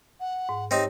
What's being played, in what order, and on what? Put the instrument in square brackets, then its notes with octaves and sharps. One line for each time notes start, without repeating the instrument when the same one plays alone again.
[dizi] F#5
[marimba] G#2
[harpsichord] C4 D#4 [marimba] G4 C#5